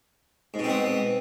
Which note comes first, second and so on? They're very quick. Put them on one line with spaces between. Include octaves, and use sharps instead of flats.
G#2 B2 C4 B3